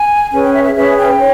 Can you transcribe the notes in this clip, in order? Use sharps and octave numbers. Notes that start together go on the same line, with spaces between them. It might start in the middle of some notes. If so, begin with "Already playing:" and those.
Already playing: G#5
C#4 G#4 B4 G#5
G5
E5
E5
C#4 G#4 B4 E5
G5
C#5